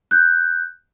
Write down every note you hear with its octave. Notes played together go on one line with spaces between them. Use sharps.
F#6 G6